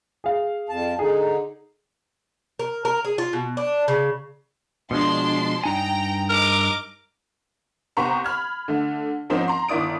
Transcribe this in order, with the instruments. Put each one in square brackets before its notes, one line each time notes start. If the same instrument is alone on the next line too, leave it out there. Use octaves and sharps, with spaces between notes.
[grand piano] G#4 F5
[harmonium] F2 A5
[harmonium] D3 D#4 [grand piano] G#4
[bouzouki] A#4
A#4
G#4
F4
B2
D4
C#3
[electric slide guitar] B2 F3 G#3 [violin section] D4 A5 C6
[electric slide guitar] G2 D#4 G#5 [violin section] G5 A#5
[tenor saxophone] A#4 [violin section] D#5 D6
[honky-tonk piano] C2 B3 G4 C5 A#5 C#6
B5 F6 G#6
D3 A3
G#2 F3 A#3 C4 C#4 D#4
A#5 C6
G1 D#3 E4 D5 D#6 D7